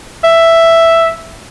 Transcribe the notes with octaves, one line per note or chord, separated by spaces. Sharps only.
E5